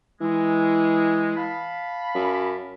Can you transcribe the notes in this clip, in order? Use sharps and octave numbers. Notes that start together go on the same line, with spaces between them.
E3 G#3
F5 A5 B5
F#2